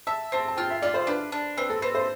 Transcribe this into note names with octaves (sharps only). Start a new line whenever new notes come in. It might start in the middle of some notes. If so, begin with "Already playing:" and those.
E5 A5
C4 A5
A5
F4 G5
E5
F4 D5
C5
D4 B4
D4
C4 B4
A4
C4 B4
C5